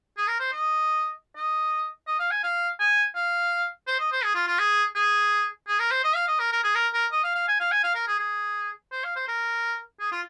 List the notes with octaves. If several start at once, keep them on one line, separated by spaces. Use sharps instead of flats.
G#4
A#4
C5
D#5
D#5
D#5
F5
G#5
F5
G#5
F5
C5
D#5
C5
G#4
F4
F4
G#4
G#4
G#4
A#4
C5
D#5
F5
D#5
A#4
A#4
G#4
A#4
A#4
D#5
F5
F5
G#5
F5
G#5
F5
A#4
G#4
G#4
C5
F5
C5
A#4
G#4
F4